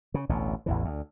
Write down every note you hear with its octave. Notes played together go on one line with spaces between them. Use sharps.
C#3
A1 D2 B2
A1 E2 E3
D2